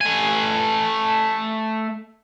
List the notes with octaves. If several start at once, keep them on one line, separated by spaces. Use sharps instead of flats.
A3 G#5